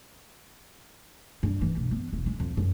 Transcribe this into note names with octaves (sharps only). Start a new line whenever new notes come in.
G2
E3
B2
B3
E1
G#3
F2
F#2